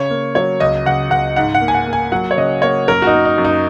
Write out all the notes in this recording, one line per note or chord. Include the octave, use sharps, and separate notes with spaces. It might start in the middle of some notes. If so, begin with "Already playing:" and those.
Already playing: C#3 C#5
A#3
F#3 C#5
C#2 D#5
C#2 F#5
C#2 F#5
G#2 F#5
F#5
A#3
G#5
F#5
A#3
G#5
F#3 F#5
C#5
C#3 D#5
A#3 C#5
F#2 A#4
F#4
D#4
A#3
D#4
F#2
D#4